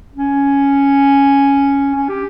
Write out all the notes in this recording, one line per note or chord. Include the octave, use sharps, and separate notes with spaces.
C#4
C#4
G4